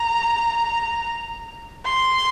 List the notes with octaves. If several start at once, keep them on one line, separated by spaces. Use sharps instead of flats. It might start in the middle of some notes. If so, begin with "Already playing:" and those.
Already playing: A#5
C6